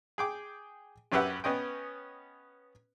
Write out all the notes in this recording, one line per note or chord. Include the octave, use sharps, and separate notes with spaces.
G#4 G5 D6
F#2 C#4 G4 B4 E5 F#5
B3 C#4 D#5 G5